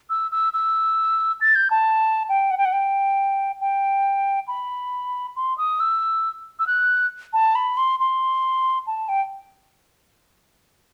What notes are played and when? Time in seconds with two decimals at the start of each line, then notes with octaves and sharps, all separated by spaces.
0.10 E6
0.31 E6
0.53 E6
1.41 A6
1.55 G6
1.71 A5
2.29 G5
2.51 F#5
2.58 G5
2.65 F#5
2.73 G5
3.61 G5
4.48 B5
5.36 C6
5.58 D#6
5.80 E6
6.59 E6
6.67 F#6
7.33 A5
7.55 B5
7.77 C6
8.00 C6
8.87 A5
9.09 G5